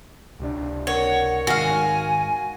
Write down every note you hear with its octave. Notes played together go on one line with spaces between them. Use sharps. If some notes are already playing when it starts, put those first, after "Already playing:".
C#2 C3 D4
A#4 C#5 F#5
G#2 D#3 G#3 F#4 F5 G#5